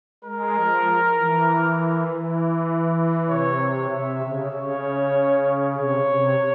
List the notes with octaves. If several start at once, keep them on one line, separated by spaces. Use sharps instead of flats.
G#3 A#4
F3
E3
E3
C3 C#5
C3 E5
C#3
C#3 C#5
C3 C#5
C3